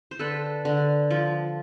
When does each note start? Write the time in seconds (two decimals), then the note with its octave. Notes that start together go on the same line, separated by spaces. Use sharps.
0.11 C5
0.19 D3 A4 B4
0.65 D3
1.10 F3